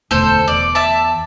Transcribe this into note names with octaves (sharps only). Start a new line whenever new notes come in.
E1 D2 A4 C5
E2 D5
E5 A5